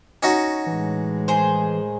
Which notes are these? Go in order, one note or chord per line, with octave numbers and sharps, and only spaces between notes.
C#4 D#4 F#4
A2 E3 G#3
D#3 G#4 C5